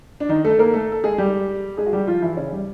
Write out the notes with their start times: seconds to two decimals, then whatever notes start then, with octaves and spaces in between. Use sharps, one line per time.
0.20 D4
0.29 D#3 D#4
0.45 A3 A4
0.59 A#3 A#4
0.73 A3 A4
0.92 A4
1.04 G#3 G#4
1.18 G3 G4
1.77 G#3 G#4
1.86 F#4
1.93 G3 G4
2.07 F3 F4
2.22 E3 E4
2.37 C#3 C#4
2.52 G3